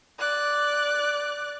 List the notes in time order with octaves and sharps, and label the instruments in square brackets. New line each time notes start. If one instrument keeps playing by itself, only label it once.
[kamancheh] D5 F#6